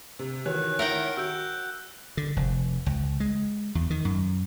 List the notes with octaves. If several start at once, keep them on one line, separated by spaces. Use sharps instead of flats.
C3
D#3 E3 F#4 C#5 F#6
E4 A#4 C#5 E5 F#5 G5
F#4 E6 G6
D3
F1
C#2
G#3
E2
D#3
F#2